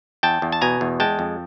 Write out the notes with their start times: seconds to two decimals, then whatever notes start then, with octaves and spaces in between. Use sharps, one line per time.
0.23 E2 G5 A5
0.42 E2
0.52 A5
0.61 B2 G#5 A#5
0.81 E2
1.00 G#3 G5 A5
1.19 F2